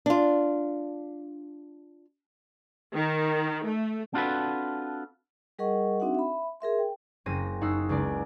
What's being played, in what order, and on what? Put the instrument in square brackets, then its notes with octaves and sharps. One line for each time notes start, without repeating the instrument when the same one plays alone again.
[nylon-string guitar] D4 F4
[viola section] D#3
A3
[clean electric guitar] C4 D4 F4 F#4 A4 B4
[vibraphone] G3 G#4 A#4 D#5 F#5 C#6
C4 D4 D#4 F#4 E5 F#5
E5 B5
G#4 A#4 E5 C6
G5
[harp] F#1 A#3 C4 A#6 D#7
F#2 D#4 F#5 E6 C7
C#2 G#3 A#4 D5